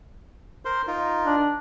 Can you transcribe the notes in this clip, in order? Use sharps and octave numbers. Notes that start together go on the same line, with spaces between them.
A#4 C5 C6
D#4 F4 A#4
D4